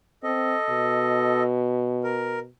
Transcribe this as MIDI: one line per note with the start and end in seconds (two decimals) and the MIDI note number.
0.23 0.55 60
0.23 1.43 69
0.23 1.43 75
0.70 2.49 47
2.04 2.39 70